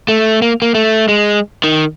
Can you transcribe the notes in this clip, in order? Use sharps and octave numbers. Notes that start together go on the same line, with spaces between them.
A3
A#3
A#3
A3
G#3
D#3